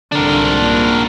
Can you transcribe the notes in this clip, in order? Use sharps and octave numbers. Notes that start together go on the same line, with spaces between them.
C2 G#2 D3 D4 A#4
A#2